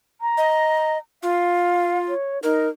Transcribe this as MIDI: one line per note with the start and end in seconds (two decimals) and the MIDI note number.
0.21 0.93 82
0.38 0.98 75
1.23 2.14 65
1.23 1.97 77
2.08 2.42 73
2.43 2.67 63
2.43 2.69 70